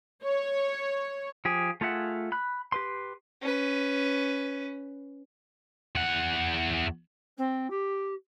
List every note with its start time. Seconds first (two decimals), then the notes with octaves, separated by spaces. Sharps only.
0.23 C#5
1.45 F3 G4 G#4
1.81 A3 F4 G#4 E5 F#5
2.32 B5 F#6
2.72 G4 B4 C6
3.42 C#4 B4
5.96 E2 F#5
7.37 C4
7.70 G4